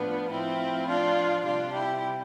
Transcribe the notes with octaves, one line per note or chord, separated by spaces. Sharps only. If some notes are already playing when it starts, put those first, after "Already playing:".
Already playing: A2 F3 B3 D4
A2 F3 C4 E4
D4 F4
C3 G3 D4 F4
E4 G4